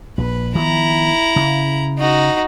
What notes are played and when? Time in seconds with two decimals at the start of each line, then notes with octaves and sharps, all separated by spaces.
0.18 A#1 B4
0.55 D#3 F3 B3 E4 A#5
1.36 C#3
1.98 D#4 F#4